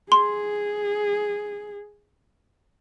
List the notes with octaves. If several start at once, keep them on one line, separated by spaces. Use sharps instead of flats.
G#4 C6